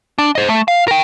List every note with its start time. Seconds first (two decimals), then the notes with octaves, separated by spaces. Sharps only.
0.18 D4
0.35 C5 D#5
0.48 A3
0.68 F5
0.88 A#4 G5